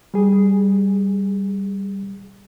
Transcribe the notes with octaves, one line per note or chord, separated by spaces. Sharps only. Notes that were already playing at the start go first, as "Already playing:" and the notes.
G3 G#4